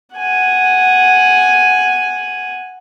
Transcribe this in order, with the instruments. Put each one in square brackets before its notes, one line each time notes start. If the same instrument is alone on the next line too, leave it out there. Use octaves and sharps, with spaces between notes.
[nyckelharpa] F#5 G#5